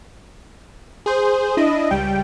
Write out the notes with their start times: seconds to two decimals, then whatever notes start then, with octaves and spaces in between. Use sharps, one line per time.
1.06 G#4 C5
1.57 D4 E4 D#5
1.91 C#2 G3 G5